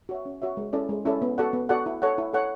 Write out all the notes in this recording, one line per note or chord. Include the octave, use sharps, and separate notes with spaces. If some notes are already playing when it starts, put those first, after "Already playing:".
F#4 C#5 E5
C#4
F#4 C#5 E5
G#3
C#4 E4 A4 D5
G#3
C#4 E4 A4 D5
B3
F#4 A4 D5 F#5
B3
F#4 A4 D5 F#5
E4
A4 C#5 F#5
E4
A4 C#5 F#5